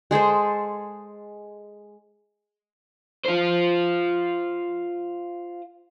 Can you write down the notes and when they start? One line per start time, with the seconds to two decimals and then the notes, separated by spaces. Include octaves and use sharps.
0.11 G#3 G#4 A4 C5
3.26 F4 C5